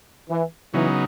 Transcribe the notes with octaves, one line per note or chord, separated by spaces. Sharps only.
E3
C#3 E3 F#3 B3 D#4